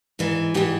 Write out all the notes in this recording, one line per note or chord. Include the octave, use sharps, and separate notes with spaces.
G#2 E3
G#2 E3 G4